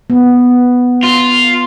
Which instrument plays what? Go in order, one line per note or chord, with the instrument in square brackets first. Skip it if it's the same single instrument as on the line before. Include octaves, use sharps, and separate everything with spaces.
[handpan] B3
[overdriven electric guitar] F4